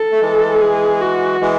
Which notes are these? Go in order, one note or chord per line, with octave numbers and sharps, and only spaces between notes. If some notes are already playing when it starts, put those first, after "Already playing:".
Already playing: A4
A3
E3 G#3
G#4
F#4
E3 G#3